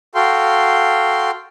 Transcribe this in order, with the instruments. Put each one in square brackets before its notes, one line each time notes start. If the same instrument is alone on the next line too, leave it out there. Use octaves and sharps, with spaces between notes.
[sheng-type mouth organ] F#4 A4 F5 G5 C6